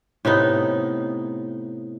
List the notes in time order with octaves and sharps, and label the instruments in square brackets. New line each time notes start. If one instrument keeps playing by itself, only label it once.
[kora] A2 C3 B3 D#4